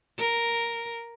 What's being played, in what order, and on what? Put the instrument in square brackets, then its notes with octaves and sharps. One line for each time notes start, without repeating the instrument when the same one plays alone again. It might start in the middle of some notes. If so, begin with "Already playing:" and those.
[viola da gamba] A#4